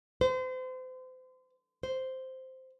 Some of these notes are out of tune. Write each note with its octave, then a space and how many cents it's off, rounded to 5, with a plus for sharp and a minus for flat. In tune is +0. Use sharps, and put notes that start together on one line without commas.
C5 -35
C5 -5